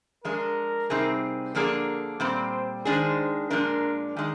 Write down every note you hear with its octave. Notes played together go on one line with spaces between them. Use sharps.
F3 G#3 D4 G#4 A#4
C3 G3 C4 D#4 G#4
D3 F3 A#3 D4 G#4 A#4
A#2 G3 C4 C5
D#3 G#3 D4 G#4 C5
A#2 F3 G#3 D4 A#4
D#3 G#3